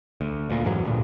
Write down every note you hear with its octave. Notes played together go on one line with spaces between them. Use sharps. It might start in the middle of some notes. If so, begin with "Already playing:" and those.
D2
D2 A#2
F2 G#2 E3 F#3
D2 G2 A#2 D3